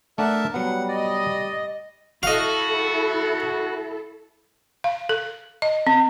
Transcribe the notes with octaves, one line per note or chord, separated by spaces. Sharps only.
A3 D4 A#4 E5 F#5 A5
F#3 G3 B3 F#5
D5 D#5
E4 F#4 A4 D#5 F5
F5
A4
D#5
C4